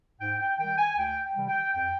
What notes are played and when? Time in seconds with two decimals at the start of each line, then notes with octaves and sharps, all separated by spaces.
0.20 G#2 G5
0.40 G5
0.58 D#3 G3 G5
0.78 G#5
0.97 D2 G5
1.23 G5
1.36 C3 D#3 G3
1.48 G5
1.74 F2 G5